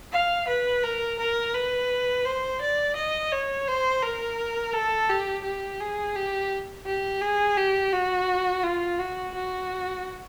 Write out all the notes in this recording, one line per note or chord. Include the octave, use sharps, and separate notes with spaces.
F5
B4
A#4
A#4
B4
C5
D5
D#5
C#5
C5
A#4
A4
G4
G4
G#4
G4
G4
G#4
G4
F#4
F4
F#4
F#4